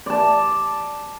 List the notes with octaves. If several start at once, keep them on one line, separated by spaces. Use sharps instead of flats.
D5 A5